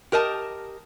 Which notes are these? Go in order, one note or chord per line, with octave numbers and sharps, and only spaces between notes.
G4 A#4 D#5 A5